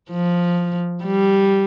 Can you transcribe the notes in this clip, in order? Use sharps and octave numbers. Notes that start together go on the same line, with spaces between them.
F3
G3